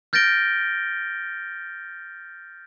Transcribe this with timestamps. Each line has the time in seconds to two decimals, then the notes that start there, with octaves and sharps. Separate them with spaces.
0.13 F6 G6 A6 A#6 D7 G7